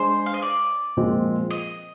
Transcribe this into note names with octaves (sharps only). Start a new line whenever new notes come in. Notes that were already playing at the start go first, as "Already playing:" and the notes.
Already playing: G#3 D4 G#4 C5
F5
D#5
D5
A#2 F3 G#3 C4 F4
D#5